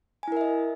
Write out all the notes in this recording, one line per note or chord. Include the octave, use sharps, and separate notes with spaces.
E4 A#4 D#5 E5 G#5